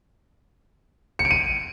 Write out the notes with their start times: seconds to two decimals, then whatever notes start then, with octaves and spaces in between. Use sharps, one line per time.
1.19 C#7
1.25 D7
1.31 D#7